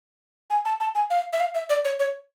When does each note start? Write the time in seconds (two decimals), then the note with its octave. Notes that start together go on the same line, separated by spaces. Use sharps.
0.50 G#5
0.65 A5
0.80 A5
0.95 G#5
1.10 F5
1.33 E5
1.40 F5
1.55 E5
1.69 D5
1.85 C#5
1.99 C#5